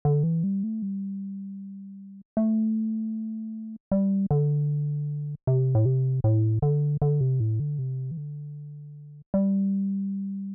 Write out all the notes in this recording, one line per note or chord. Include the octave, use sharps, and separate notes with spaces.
D3
E3
G3
A3
G3
A3
G3
D3
C3
A2
C3
A2
D3
D3
C3
A2
D3
C3
E3
D3
G3